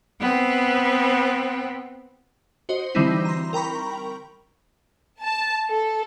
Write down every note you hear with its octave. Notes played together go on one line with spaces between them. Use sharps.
B3 C4
F#4 C5 D#5
D3 E3 G3 C4 D#4 E4
A#5 C6
A#4 G5 A#5 B5 C#6
A5
A4